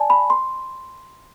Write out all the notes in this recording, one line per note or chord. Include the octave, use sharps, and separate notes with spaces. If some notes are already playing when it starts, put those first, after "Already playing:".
Already playing: D5 G#5 A5
B5
C6